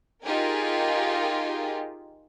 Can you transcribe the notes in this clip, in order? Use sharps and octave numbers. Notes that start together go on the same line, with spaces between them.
D#4 F4 G4 G#4 A#4